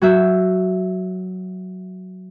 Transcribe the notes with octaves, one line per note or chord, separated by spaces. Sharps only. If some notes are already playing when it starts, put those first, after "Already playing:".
F#3 F#4 E5 G6